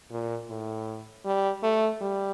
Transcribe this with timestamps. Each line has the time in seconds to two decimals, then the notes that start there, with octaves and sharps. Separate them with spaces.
0.11 A#2
0.50 A2
1.25 G3
1.63 A3
2.01 G3